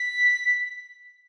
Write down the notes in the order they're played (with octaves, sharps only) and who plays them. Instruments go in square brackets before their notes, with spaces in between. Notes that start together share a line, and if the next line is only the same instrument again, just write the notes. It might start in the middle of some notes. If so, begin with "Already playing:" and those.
Already playing: [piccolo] B6